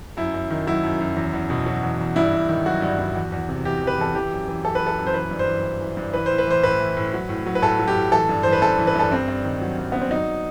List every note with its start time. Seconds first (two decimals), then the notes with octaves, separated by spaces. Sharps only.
0.17 F#2 E4
0.34 F#2
0.50 D#3
0.67 F#3 E4
0.84 F#2
1.00 F#2
1.16 E2
1.33 E2
1.50 B2
1.66 F#3
1.83 E2
2.00 E2
2.16 G2 E4
2.33 G2
2.49 D#3
2.66 F#3 F#4
2.82 G2
2.99 G2
3.15 E2
3.32 E2
3.49 C3
3.65 E3 G4
3.82 E2
3.87 B4
3.98 E2 A4
4.15 E3 G4
4.31 F#2
4.48 E3
4.64 F#2 A4
4.75 B4
4.81 E3
4.87 A4
4.98 F#2
5.07 C5
5.14 E3 B4
5.31 G2
5.39 C5
5.48 E3
5.64 G2
5.81 E3
5.97 G2
6.14 E3 B4
6.26 A2 C5
6.38 B4
6.47 E3 C5
6.63 A2 B4
6.79 E3
6.97 A2
7.13 F#3
7.29 A2
7.46 F#3
7.55 B4
7.62 A2 A4
7.79 F#3
7.88 G4
7.96 A2
8.12 E3 A4
8.29 G2
8.43 E3 C5
8.53 B4
8.62 G2 A4
8.78 E3
8.87 B4
8.95 G2 A4
9.12 G2 C4
9.28 G2
9.45 D#3
9.61 F#3
9.78 G2
9.92 G2 B3
10.01 C4
10.11 F#3 D#4